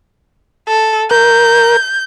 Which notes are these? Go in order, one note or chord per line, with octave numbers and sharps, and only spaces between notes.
A4
A#4 G6